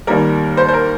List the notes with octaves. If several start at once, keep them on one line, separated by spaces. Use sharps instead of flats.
D#2 D#3 G3 A#3 A#4
C5
C5
A#4